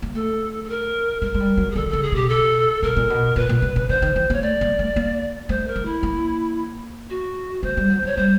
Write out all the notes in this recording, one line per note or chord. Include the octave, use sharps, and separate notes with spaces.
A#3
A3 A4
A4
A#4
G#3 A#4
G#3
G3
F#3
G#4
D3 A4
C#3 A4
G#4
B2 G4
A4
B2 A#4
A#2
B2
A#2 B4
A#2
B2
C#3
D3 C5
D#3
E3
A#3 C#5
A3 D5
A#3
A3
A#3
A3 C5
A#4
A3
E4
A#3
F#4
A3 C5
G3
F#3
F#3 C#5
G3 C5